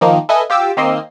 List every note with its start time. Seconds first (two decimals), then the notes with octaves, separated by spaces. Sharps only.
0.01 D#3 F3 A#3 D#4
0.29 A4 B4 D#5 E5 G#5
0.50 F4 G4 D6 E6
0.77 D#3 A#3 C4 D#5 E6 C7